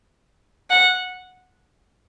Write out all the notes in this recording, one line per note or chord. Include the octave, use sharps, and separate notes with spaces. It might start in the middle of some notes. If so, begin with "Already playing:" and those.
F#5